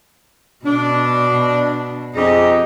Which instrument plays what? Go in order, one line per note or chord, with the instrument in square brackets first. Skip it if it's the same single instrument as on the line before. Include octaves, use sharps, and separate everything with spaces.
[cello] B2 [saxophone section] D4
[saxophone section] F2 G4 G#4 [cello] D#4